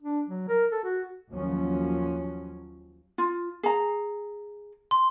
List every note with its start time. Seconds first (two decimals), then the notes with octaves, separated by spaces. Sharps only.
0.03 D4
0.28 F#3
0.49 A#4
0.72 A4
0.84 F#4
1.32 D#2 F3 F#3 C#4
3.18 F4
3.63 G#4 A#5
4.91 C6